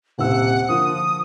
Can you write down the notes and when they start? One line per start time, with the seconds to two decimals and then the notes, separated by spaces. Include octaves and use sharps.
0.19 D#1 C#2 C3 F#5 E6
0.69 D3 F3 A#3 F4 D#6